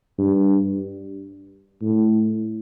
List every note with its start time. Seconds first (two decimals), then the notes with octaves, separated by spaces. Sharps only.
0.19 G2
1.82 A2